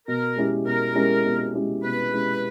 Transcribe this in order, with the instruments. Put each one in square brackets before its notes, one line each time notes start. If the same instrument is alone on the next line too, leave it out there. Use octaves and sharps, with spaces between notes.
[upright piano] B2 [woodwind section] A#4
[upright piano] G#3 C#4 E4 G4
[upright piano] B2 [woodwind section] A#4
[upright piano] G#3 C#4 E4 G4
B2
G#3 C#4 E4 G4
[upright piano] B2 [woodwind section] B4
[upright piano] G#3 C#4 E4 G4